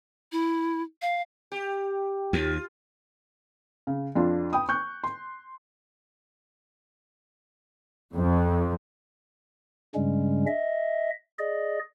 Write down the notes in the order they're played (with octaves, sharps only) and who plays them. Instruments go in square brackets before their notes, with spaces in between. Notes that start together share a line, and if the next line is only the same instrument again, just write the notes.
[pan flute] E4
F5
[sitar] G4
[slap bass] D#2 [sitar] F4
[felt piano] C#3
F2 D4 F4
G5 B5 D#6
C#6 F#6 G6
C6
[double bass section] F2
[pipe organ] G2 C#3 G3 G#3 C#4
D#5 E5
G#4 D5 D#5